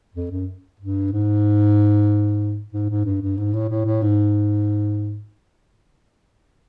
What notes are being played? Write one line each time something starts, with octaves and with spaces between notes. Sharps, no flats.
F2
F#2
G2
G#2
G#2
G#2
G2
G2
G#2
A2
A2
A2
G#2